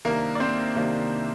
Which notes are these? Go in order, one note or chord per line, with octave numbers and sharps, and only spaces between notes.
C2 C3 D#3 A#3 D4 A#4
D5
C4 C5
C2 C3 D#3 A#3 D4